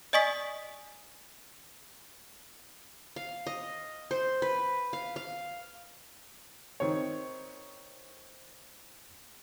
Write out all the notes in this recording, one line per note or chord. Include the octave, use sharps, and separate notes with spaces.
D5 D#5 G#5 C#6 D#6 B6
F5
D#5
C5
B4
F5
F5
D#3 C4 C#5